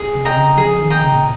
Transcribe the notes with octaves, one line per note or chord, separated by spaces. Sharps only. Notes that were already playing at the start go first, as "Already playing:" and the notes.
Already playing: G#4
C3
D#5 G5 A#5
C#3
F3 G#4
D#3
D#5 G5 A#5
C#3
A#2